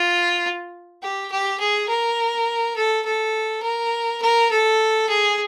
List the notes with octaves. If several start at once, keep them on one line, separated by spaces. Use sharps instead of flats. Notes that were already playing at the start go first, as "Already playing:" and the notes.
Already playing: F4
G4
G4
G#4
A#4
A4
A4
A#4
A#4
A4
G#4